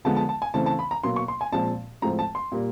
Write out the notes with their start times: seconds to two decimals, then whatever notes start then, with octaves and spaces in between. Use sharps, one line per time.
0.05 D3 F3 G#3 B3 A5
0.16 A5
0.29 A5
0.42 G#5
0.54 C#3 E3 A3 C4 A5
0.66 A5
0.79 B5
0.91 A#5
1.03 B2 F#3 A#3 C6
1.16 C#6
1.28 C6
1.41 G#5
1.52 A#2 F3 G#3 C4 A5
2.02 A2 F3 G#3 C4 A#5
2.19 A5
2.35 C6
2.52 A#2 G3 A#3